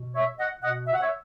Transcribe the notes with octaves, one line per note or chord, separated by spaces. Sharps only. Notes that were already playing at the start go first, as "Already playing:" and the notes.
Already playing: B2
C#5 E5
D#5 F#5
B2 D#5 F#5
E5
F#5
C#5 E5